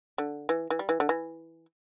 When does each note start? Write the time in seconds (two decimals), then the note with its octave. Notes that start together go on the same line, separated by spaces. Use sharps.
0.18 D3
0.49 E3
0.70 E3
0.79 G3
0.89 E3
1.00 D3
1.09 E3